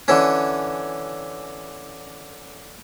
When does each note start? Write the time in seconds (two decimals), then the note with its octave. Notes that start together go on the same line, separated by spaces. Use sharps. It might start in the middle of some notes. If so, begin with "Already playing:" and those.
0.08 D3 E3 C#4